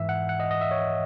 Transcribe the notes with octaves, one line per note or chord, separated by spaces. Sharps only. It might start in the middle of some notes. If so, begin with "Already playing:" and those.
Already playing: G#2 E3 E5
F#5
F#5
D#5
D#5
E5
C#5